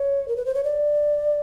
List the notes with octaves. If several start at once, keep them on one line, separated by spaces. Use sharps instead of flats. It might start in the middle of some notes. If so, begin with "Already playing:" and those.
Already playing: C#5
A#4
B4
C5
C#5
D5